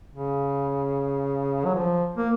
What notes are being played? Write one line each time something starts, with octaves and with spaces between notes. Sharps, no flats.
C#3
F#3
F3
A#3